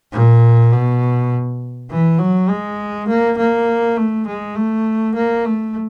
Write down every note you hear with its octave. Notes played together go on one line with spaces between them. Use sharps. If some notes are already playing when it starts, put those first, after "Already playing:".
A#2
B2
E3
F#3
G#3
A#3
A#3
A3
G#3
A3
A#3
A3